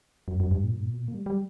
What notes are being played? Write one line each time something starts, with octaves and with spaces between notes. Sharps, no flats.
F#2
F#2
G2
A#2
G2
A#2
B2
A#2
A#3
G3
G3